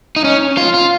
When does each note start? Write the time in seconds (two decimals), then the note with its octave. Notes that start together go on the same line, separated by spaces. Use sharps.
0.16 D#4
0.24 C#4
0.57 F4
0.74 F4